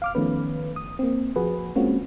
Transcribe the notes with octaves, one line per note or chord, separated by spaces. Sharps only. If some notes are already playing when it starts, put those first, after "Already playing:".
F5 D6 F6
D#3 F3 A3 B3 C#4 B4
D#6
A#3 C4
F3 F#4 G#4 B4
G#3 A#3 C4 C#4 F4 F#4